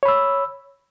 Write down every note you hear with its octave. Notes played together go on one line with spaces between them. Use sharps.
C#5 B5 E6